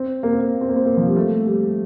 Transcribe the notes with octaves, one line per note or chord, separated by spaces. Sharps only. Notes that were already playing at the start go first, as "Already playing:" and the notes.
Already playing: C4
A#3
C4
A#3
C4
A#3
C4
A#3
F3
G3
A3
G3